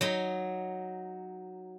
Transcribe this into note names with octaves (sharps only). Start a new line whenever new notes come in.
F#3 D#4